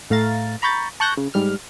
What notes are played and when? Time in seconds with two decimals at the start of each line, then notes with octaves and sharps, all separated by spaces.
0.10 A2 A3 F5 A#5 A6
0.62 A#5 B5 C#6 G6 A6
1.00 A5 C#6 F#6 G6 A#6
1.17 C#3
1.34 G#2 G3 F6